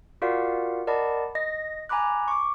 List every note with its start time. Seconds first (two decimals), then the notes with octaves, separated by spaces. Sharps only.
0.22 F4 F#4 A#4 D5 F5 F#5
0.87 A#4 D5 D#5 F#5 A5 B5
1.35 D#5 A#6
1.89 G#5 A#5 B5 D6 F#6
2.28 C#6 D6